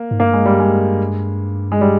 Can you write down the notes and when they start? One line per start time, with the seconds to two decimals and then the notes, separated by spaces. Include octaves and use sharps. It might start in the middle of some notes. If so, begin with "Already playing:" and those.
Already playing: A#3
0.11 G#2
0.20 G2 A#3
0.33 G#3
0.46 G3
0.60 G#3
1.72 G#3
1.81 G3